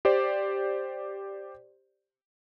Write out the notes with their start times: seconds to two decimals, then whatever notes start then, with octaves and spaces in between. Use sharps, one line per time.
0.05 G4 C5 D5